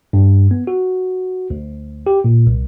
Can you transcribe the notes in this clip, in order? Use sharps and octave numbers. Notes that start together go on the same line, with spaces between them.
G2
B3
F#4
D2
G4
A#2
C2